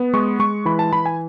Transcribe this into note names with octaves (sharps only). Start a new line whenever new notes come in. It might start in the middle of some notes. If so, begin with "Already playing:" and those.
Already playing: B3
G#3 C#6
G#3 C#6
E3 B5
A5
E3 B5
G#5